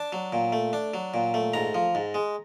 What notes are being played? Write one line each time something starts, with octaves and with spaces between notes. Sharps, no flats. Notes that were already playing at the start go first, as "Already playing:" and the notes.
Already playing: D4 A5
F#3
A#2
A3
D4
F#3
A#2
A3
G#2 A#5
F3
G#2
G#3